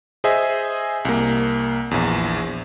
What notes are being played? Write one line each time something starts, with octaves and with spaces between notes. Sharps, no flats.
G#4 C5 D#5 E5 G#5
C2 A#3
A#1 E2